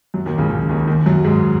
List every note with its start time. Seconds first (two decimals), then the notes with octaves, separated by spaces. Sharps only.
0.14 F#2 F#3
0.26 D#2 D#3
0.38 C#2 C#3
0.50 C#2 C#3
0.69 D#2 D#3
0.87 D#2 D#3
1.06 F#2 F#3
1.24 G#2 G#3